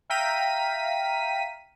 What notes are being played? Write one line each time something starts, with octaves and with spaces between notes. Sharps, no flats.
E5 F5 G5 A#5 B6 D#7